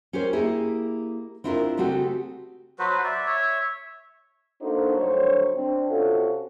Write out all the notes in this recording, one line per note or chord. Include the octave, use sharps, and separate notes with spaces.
C#4 G4 A#4 C5
A#3 E4 G4 G#4
C4 D4 E4 F4 G4 A#4
C#3 A3 C4 F#4 G4
F#3 F#4 B4 C5
D5 E5
C#5 E5
A#3 D4 D#4 F#4 A4 C5
D2 G2 F#3 C5 C#5
C4 D4
C3 C#4 F4 F#4 A4